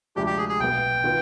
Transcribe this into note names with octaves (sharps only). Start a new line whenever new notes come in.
D2 C3 F3 G#3 D4 G4
G4
G#4
G#4
B1 B2 B3 G5
D#3 B3 F4 B4